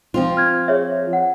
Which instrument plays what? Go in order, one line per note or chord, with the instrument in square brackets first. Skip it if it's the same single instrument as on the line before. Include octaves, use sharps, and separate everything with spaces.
[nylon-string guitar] F3 C4 F4
[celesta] F6 G#6
G#4 C#5 E5
F#5